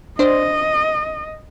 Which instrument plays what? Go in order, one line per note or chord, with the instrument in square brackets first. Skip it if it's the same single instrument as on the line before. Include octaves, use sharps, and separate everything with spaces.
[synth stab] D4 C5 [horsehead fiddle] D#5